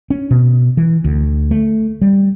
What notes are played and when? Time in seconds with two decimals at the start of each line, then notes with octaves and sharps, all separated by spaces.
0.10 C#4
0.31 B2
0.77 E3
1.04 D2
1.51 A3
2.02 G3